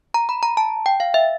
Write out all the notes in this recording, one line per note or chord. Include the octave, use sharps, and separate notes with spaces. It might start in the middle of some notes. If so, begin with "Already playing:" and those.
A#5
B5
A#5
A5
G5
F5
E5